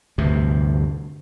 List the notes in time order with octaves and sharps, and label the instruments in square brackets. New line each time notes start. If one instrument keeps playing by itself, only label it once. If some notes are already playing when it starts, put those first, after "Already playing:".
[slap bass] D2 G2 C3